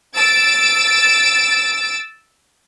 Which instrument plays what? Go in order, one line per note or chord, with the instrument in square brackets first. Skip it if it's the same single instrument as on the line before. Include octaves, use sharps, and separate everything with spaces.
[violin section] E6 A6 D7